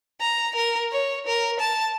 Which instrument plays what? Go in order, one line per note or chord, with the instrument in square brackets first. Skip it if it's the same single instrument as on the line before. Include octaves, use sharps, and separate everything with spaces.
[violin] A#5
A#4
C#5
A#4
A5